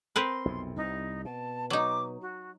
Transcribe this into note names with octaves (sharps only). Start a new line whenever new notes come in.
C4 A#4 B4 C6
B1 F2 C3
C2 D#4
B2 A5
F#3 D#4 D6
F#4